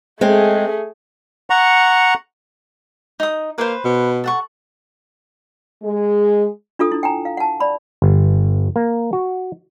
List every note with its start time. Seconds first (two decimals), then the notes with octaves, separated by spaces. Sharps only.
0.21 G#3 A3 C4 G#4
1.50 F#5 A#5 C#6
3.20 D#4 D#6
3.58 A#3 B4 C5
3.85 B2
4.24 A4 F#5 C#6
5.83 G#3 G#4
6.79 D4 F4 A4 D#6
6.92 D4 E4
7.03 G5 G#5 A#5
7.25 F5
7.37 F#5 A5
7.60 D5 B5
8.02 G1
8.76 A#3
9.13 F#4